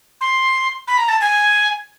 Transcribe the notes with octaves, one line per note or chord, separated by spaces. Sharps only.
C6
B5
A#5
A5
G#5